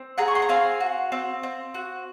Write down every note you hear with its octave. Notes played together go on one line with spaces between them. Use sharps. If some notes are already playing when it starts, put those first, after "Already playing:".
Already playing: C4
G#4 F#5 A#5
C#6
C6
A#5
C4 F5 G#5
F#4
C4
C4
F#4